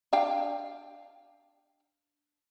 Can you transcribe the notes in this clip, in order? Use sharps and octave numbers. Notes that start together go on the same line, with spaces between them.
D4 F5 G5